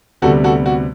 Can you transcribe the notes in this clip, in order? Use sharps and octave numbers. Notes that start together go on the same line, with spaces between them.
D2 C3 G3 B3 F#4 A4
F#4 A4
F#4